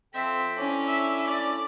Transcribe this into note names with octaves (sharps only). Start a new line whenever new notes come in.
F3 C4 A4 E5 G5
C#4 D4 E4 A4 D6
E5
D5